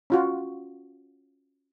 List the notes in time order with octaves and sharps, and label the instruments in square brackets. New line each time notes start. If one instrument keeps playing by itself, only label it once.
[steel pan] C#4 F4 F#4